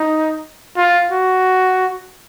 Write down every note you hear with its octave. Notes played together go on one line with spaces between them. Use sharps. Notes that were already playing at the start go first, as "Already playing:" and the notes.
Already playing: D#4
F4
F#4